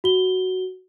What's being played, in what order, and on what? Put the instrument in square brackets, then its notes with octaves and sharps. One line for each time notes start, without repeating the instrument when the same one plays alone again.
[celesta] F#4 G7